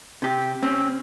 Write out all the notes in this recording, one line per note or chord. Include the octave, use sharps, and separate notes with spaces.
C3 G4
C4 C#4